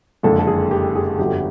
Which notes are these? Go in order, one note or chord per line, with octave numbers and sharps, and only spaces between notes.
F#1 F2 D3 F3 G#3 A4
A4
G#4
G4
G#4
G1 F2 D3 F#3 G4